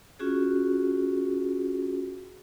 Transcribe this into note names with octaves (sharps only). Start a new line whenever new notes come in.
C#4 F4 F#4 G#4